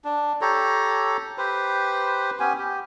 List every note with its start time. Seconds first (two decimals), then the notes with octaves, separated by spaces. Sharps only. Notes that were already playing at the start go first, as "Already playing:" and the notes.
0.04 D4
0.41 G4 A4 C#5 A#5
1.38 G4 B4 C5
2.40 B3 C#4 G4 G#5
2.59 G4